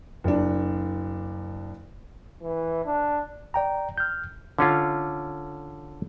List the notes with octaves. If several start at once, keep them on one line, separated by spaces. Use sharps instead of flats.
F#1 D4
E3
D4
D5 G5 A#5
F6 G6
D3 C#4 F4